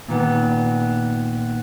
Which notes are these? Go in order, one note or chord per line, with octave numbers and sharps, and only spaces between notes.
A#2 D#3 B3